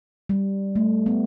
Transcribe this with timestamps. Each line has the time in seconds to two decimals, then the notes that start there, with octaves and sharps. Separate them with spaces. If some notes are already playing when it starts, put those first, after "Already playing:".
0.29 G3
0.76 A3
1.06 B3